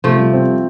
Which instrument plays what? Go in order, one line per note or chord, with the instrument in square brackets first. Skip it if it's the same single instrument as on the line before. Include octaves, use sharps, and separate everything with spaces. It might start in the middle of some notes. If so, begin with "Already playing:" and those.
[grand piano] C3 [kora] F3 A3
[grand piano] G3
C4